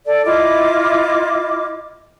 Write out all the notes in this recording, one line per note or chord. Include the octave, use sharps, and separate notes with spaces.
A4 D5
E4 F4 D#5 D6